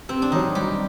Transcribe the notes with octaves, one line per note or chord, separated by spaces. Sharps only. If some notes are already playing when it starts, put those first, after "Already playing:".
C3 C4
D4
D#3 F#3 D#4
C2 G4